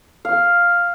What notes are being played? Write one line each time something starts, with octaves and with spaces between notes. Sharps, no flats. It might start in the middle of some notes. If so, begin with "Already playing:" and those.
F5